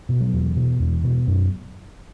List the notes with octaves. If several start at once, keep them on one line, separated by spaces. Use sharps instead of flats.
B2
F#3
E2
B2
E2
B2
F#2